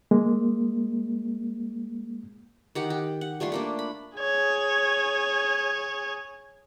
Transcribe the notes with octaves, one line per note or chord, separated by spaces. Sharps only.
G#3 A#3
D#3 G4 F#5
G4
F#5
G3 A3 F4 C6
A3 A#3 D4
B5
G#4 C#5